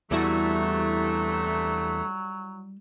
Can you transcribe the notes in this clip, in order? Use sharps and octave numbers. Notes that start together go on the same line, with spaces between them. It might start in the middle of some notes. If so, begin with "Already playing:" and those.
E2 G2 C3 F#3 G3 A3 E4 F#4